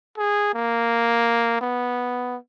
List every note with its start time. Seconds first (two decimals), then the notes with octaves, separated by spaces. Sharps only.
0.18 G#4
0.54 A#3
1.61 B3